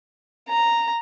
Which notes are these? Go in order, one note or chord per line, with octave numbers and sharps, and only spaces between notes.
A#5